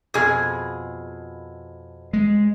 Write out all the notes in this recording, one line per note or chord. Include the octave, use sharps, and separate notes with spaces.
F2 B2 G#4
G#3